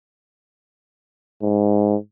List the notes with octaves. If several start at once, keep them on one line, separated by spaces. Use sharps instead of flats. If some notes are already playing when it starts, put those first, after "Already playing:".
G#2